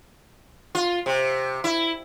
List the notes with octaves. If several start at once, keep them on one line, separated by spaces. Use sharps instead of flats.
F4
C3
E4